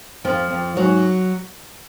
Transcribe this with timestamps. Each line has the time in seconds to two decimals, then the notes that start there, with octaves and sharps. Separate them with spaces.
0.24 F2 F3 F4
0.50 F2
0.76 G#2 F#3 F#4